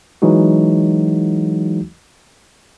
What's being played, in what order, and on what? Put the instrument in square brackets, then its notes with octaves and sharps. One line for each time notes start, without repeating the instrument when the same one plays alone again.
[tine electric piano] E3 F#3 G#3 D#4 F#4